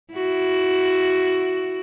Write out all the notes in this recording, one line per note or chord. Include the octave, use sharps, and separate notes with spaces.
E4 F#4